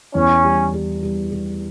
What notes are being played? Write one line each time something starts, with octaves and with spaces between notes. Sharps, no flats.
E2 C#4
G3
G3
G3
G3